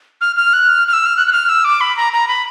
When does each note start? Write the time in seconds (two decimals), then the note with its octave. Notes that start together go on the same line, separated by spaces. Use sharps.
0.21 F6
0.36 F6
0.53 F#6
0.69 F6
0.88 F6
0.93 E6
1.06 F6
1.17 F#6
1.27 F#6
1.32 F6
1.49 E6
1.64 D6
1.81 B5
1.97 A#5
2.13 A#5
2.28 B5